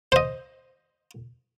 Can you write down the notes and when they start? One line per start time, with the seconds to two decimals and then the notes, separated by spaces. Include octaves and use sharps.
0.12 C5 D#5